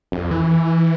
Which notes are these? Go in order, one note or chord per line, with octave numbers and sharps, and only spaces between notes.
F2
E3